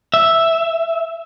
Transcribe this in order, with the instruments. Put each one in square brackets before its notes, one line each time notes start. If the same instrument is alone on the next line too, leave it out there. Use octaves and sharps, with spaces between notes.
[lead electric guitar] E5